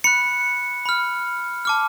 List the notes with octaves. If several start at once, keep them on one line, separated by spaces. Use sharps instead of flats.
B5 F#6 C#7
B5 F6
A5 D6 F6